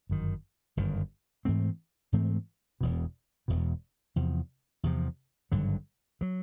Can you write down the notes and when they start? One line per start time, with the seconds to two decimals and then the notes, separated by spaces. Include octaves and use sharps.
0.09 G1 F#2 D#3
0.77 G1 F#2 D#3
1.45 G#2 E3 A3 C4
2.13 G#2 E3 A3 C4
2.81 E1 E2 B2
3.48 E1 E2 B2
4.16 E2 C3 F3
4.83 E2 C3 F3
5.52 G#1 G2 D3 F#3
6.21 D3 F#3